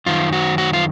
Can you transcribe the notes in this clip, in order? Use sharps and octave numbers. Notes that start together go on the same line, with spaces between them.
F#2 D#3 F4
F#4
F#4
F4